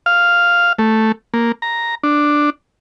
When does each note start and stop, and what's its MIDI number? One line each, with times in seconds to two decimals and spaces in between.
0.06 0.73 77
0.79 1.12 57
1.34 1.52 58
1.62 1.95 82
2.03 2.50 62